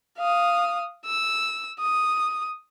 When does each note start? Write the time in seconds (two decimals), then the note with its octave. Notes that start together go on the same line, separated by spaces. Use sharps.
0.19 F5 D#6
1.06 E6
1.81 D#6